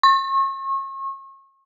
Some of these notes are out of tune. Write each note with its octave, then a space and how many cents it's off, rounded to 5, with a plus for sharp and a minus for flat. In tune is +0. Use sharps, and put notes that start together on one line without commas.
C#6 -35